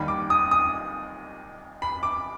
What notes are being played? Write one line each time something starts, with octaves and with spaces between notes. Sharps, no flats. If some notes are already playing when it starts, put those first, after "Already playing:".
Already playing: D#2 D#3 G3 B5
D6
D#6
D#6
B5
D6